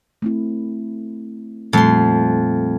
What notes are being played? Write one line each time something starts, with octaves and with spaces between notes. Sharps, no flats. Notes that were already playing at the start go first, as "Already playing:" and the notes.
A3 C4 E4
F2 A#2 G3 A3 C6